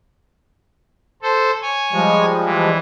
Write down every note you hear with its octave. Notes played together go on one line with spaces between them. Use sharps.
A4 C5
C#5 G#5
F3 G3 G#3
E3